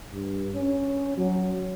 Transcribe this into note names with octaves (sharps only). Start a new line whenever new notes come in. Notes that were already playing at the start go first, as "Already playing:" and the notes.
G2
C#4
F#3